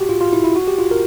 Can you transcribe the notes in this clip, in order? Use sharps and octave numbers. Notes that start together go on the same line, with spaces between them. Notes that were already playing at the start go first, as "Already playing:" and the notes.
Already playing: F#4 G4
F4
F4
E4
E4
F#4
G4
F4
A#4